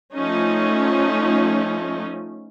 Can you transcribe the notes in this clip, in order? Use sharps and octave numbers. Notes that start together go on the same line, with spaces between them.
F3 A3 C#4 D#4